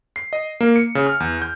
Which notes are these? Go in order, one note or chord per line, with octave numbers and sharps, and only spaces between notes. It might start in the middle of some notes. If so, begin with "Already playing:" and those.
C7
D#5
A#3
C#7
C#3
F6
E2
G6